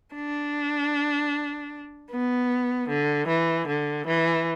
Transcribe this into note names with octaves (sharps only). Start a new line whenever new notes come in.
D4
B3
D3
E3
D3
E3